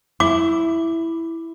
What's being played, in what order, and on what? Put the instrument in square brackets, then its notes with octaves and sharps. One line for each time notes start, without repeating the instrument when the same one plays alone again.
[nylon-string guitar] E4 [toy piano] D6